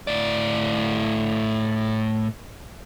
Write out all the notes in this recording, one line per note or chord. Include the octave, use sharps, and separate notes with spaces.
A2 D5